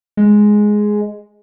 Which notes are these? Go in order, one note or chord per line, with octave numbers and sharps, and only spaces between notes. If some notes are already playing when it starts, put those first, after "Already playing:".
G#3